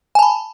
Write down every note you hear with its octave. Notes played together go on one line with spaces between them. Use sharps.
G#5 A5 B5